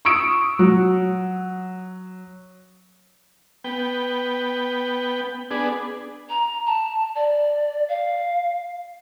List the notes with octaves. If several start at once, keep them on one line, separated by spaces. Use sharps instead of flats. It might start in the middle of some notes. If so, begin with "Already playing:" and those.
C#6 D#6 E6 C#7 D7
F#3
B3 G5
B3 D4 G#4
A#5
A5
D5
F5